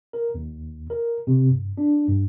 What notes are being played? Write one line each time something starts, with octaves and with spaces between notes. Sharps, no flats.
A#4
D#2
A#4
C3
G2
D4
G2